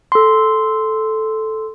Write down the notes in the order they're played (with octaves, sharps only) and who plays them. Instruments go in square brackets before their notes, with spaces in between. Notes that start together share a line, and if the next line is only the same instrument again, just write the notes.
[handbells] A4 C6